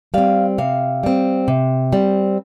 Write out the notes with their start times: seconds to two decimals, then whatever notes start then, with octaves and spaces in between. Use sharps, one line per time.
0.14 G3 C4 F5
0.58 C3 F5
1.03 G3 C4
1.48 C3
1.92 G3 C4